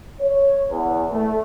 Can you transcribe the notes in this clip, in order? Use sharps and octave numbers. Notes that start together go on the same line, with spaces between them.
C#5
E2
A3